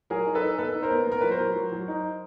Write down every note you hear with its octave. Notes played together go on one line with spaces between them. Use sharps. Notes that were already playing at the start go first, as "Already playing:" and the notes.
F#3 G#4 A#4
D#4
A4 B4
D#4
B3 A4 B4
D#4
A#4 C5
B3
B3 A#4
F#3 B4
A#4 C5
F#3
F#3
F#3
D#4